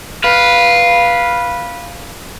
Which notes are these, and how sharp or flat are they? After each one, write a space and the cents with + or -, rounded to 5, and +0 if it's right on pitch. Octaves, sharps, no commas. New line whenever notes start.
B4 -10 F5 +0